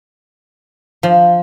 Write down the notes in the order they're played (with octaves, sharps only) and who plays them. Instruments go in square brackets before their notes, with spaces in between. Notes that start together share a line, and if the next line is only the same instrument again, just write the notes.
[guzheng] F3